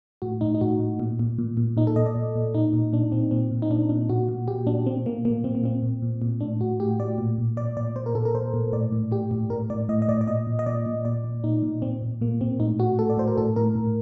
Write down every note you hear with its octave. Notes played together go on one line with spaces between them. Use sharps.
A2 F#4
A2 D#4
D#4
A2 F#4
A2
A#2
A#2
A#2
A#2
A#2 D#4
A4
A#2 D#5
D5
A#2
A#2
A#2 D#4
A#2
A#2 D4
A#2 C4
A#2 C4
A#2
D#4
A#2 D4
A#2 D4
A#2 F#4
A#2
A#2 G4
A#2 D4
A#2 C4
A#2 A#3
A#2 A#3
A#2 C4
A#3
A#2 C4
A#2
A#2
A#2
A2 D4
A2 F#4
A2 G4
A2 D5
A#2
A#2
A#2 D5
A#2 D5
A#2 C5
A#4
A#2 A4
A#4
A#2 C5
A#2
A2 D5
A2
A2 G4
A2
A2 A#4
A2 D5
A2 D#5
D#5
A2 D5
D5
A#2 D#5
A#2
D#5
A#2 D5
A#2
A#2 D5
A#2
A#2 D#4
A#2
A#2 C4
A#2
A#2 A#3
A#2 C4
A2 D#4
A2 F#4
A2 A4
D5
A2 C5
A#4
A2 A4
A2 A#4
A2